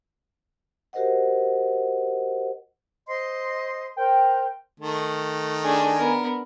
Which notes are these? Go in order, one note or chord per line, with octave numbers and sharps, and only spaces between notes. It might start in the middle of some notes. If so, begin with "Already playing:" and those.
F#4 G4 A#4 C5 D#5 F#5
C5 D#5 C6
A#4 C5 G5
D#3 A3
D4 G#4 G#5
B3 A#4